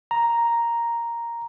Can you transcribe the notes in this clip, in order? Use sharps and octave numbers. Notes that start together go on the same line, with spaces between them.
A#5